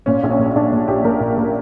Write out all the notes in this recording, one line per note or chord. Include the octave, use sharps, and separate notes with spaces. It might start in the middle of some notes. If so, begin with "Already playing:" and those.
A#2 C#4
A#1
C#4
A#2
A#1 D4
A#2
A#1 G4
A#2 A#4
A#1
A#2